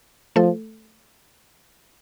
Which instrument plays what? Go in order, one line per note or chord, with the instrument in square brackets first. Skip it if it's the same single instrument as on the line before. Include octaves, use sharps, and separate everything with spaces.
[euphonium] F3 [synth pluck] A3 A4